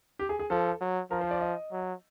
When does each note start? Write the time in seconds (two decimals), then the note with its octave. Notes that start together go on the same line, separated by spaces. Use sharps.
0.19 G4
0.29 G#4
0.39 G#4
0.50 F3 A4
0.81 F#3
1.11 F3 A#4
1.21 C5
1.31 D5
1.41 D#5
1.72 F#3